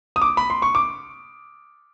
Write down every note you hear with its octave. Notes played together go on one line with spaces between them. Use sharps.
D#6
D6
B5
C6
C#6
D6